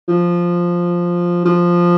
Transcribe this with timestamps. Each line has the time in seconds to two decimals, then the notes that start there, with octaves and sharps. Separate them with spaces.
0.08 F3
1.45 F3